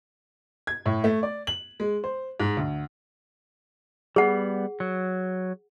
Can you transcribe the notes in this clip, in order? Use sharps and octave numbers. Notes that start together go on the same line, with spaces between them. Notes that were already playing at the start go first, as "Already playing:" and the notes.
G#6
A2
A3
D5
F#7
G#3
C5
G#2
D2
G3 B3 G#4 F#5
F#3